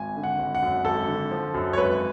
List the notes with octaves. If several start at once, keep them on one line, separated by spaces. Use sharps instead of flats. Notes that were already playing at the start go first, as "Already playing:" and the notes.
Already playing: G#1 G#5
D3
F#5
G#1
F#5
F#2
G#1 A4
D3
F3
F#2
C#5
G#1 B4